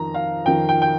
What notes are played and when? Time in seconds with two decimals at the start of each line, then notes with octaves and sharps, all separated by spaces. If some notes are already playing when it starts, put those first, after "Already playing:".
Already playing: F2 D#3 A#5
0.14 F5
0.45 F2 D#3 G5
0.69 G5
0.82 G5